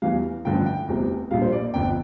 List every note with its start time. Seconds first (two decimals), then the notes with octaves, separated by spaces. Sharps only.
0.02 E2 E3 G3 F5
0.45 A1 G2 D3 F3 G5
0.66 G5
0.88 F1 E2 C3 G3
1.31 A#1 A#2 G3 F5
1.42 C5
1.52 D5
1.74 G1 F2 D3 G5